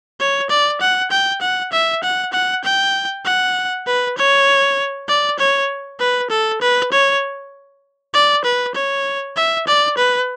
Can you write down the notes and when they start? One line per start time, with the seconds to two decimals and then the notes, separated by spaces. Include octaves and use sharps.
0.20 C#5
0.50 D5
0.81 F#5
1.11 G5
1.41 F#5
1.72 E5
2.03 F#5
2.33 F#5
2.64 G5
3.25 F#5
3.86 B4
4.17 C#5
5.08 D5
5.39 C#5
6.00 B4
6.30 A4
6.61 B4
6.92 C#5
8.14 D5
8.44 B4
8.75 C#5
9.36 E5
9.67 D5
9.97 B4